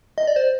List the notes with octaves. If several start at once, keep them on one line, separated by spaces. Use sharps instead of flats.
D#5
D5
C5